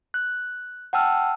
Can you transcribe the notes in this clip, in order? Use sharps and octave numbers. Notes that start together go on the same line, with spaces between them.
F#6
F#5 G5 A5 E6 F6